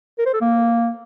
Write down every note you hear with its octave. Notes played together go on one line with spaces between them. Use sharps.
A#4
C5
A4
A#3